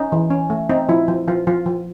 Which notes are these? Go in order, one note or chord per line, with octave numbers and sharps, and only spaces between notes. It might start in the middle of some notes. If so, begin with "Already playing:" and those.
Already playing: C#4 D#4
E3
C#4
A3
C4 D#4
F3 E4
F3
F3 F4
F3 F4
F3